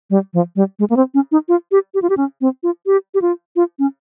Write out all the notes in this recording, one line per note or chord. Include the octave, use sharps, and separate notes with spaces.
G3
F3
G3
G#3
A#3
C4
C#4
D#4
F4
G4
G4
F4
G4
C#4
C4
F4
G4
G4
F4
F4
C#4